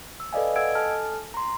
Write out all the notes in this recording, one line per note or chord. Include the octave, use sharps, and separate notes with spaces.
E6
A4 B4 D5 D#5 F5 G#5
A4 D#5 F#5 E6 G#6 D7
A4 G#5 A5 F6
A#5 C6